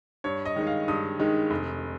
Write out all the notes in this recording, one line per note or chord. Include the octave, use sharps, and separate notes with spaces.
G2 C#5
D#5
D#3 G#3 D#4
F5
G2 D#6
D#3 G#3 D#4
F1